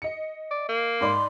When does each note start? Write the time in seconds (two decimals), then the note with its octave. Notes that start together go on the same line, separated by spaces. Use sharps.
0.02 D#5 C#7
0.51 D5
0.69 A#3
1.01 G#2 D5 B5 C6